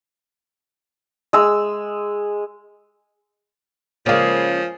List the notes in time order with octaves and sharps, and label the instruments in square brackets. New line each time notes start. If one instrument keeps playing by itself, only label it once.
[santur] G#3 E6
[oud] C#3 G#3 [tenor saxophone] F3 [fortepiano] A#3 D5 F5 [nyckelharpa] G#4